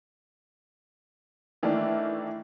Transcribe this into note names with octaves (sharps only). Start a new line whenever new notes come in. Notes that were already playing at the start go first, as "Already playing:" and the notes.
D#3 E3 A3 D4